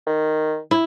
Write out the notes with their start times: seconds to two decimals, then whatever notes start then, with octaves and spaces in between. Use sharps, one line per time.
0.06 D#3
0.71 E4